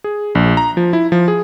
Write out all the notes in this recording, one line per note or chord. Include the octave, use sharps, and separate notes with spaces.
G#4
A#1
A#5
F3
E4
F3
G#4